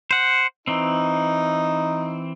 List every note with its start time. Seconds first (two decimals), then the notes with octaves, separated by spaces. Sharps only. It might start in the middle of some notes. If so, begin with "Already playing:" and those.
0.11 C5 F#5
0.67 E3 C4 D#4